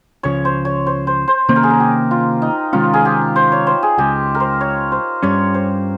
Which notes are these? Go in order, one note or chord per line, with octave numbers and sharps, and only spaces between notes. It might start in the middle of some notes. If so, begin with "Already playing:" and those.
C#2 C#3 F3 C#5
C5
C#5
C5
C5
C5
C3 D#3 A#3 C#4 C5
A#4
G#4
A#4
G4
F4
D#4
C3 D#3 G#3 C#4 F4
G#4
G4
C5
C#5
C5
G#4
C#2 C#3 G#3 G4
A#4
C5
C#5
C5
G2 G3 C#4 C#5
C5